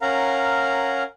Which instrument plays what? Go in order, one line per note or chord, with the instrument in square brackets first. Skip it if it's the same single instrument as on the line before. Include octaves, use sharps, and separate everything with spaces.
[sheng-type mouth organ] C#4 A#4 F5 F#5 A#5